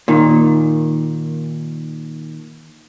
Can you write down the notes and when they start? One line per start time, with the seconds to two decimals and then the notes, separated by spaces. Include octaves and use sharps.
0.08 A#2 D#3